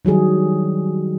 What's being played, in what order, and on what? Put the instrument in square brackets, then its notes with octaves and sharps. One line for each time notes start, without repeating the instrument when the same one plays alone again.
[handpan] D#3 F#3 G3 G#4